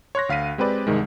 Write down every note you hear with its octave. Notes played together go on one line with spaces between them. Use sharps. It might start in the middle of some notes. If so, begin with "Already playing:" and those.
C#5 C6 F#6 A#6
D2 F5 B6 D#7
G#3 C4 G4 B4 D5
C2 G#2 D#3 G#3